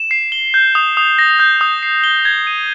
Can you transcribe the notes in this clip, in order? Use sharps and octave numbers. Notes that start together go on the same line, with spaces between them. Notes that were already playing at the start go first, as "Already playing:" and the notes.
Already playing: E7
C7
G7
G6
D#6
D#6
A#6
G6
D#6
C7
G7
G#6
D#7